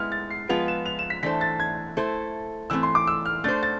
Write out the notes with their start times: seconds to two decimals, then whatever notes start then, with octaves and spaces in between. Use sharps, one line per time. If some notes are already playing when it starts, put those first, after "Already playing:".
Already playing: G#3 B3 E4 B4 F6
0.12 A6
0.31 C7
0.49 F3 G#3 B3 F4 B4 F7
0.68 E7
0.86 F7
0.99 E7
1.10 B6
1.23 E3 A3 D4 A4 C5 B6
1.41 A6
1.60 G#6
1.97 A3 E4 A4 C5
2.70 E3 A3 C4 E6
2.83 C6
2.95 D6
3.07 E6
3.25 F6
3.44 A3 D4 A4 C5 A6
3.63 A6